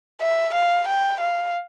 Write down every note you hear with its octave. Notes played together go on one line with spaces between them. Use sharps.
E5
F5
G5
F5